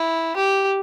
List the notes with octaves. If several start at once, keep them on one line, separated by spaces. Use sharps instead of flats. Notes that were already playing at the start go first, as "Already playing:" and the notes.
Already playing: E4
G4